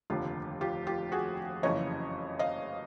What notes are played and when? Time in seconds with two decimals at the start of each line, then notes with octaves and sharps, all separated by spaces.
0.10 F1 D#2 D3 F4 G4
0.61 F4 G4
0.87 F4 G4
1.12 F#4 G#4
1.63 F#1 F2 C#3 E3 C#5 D#5
2.39 D#5 F5